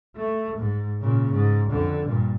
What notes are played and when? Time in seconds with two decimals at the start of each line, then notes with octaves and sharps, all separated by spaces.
0.16 A3
0.57 G#2
1.00 A#2 C#3
1.31 G#2
1.70 F2 D3
2.05 G2 A#2